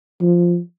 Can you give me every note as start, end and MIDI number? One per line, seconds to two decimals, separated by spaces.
0.21 0.59 53